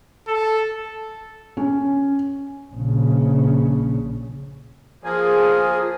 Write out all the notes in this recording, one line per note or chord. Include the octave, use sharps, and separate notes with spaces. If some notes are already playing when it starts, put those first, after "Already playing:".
A4
C#4
A#1 C#3
F3 A#3 G#4